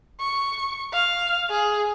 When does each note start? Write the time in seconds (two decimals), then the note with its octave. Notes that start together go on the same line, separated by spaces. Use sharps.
0.21 C#6
0.93 F5
1.50 G#4